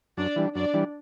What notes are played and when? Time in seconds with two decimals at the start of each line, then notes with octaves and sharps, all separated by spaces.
0.17 F#2 D4 D5
0.36 E3 G3 D4
0.55 F#2 D4 D5
0.73 E3 G3 D4